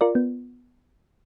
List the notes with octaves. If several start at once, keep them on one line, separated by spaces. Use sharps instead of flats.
F4 A#4 D5
B3